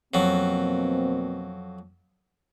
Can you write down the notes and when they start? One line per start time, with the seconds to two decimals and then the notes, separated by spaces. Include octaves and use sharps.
0.14 F2 B2 F#3 A#3 C4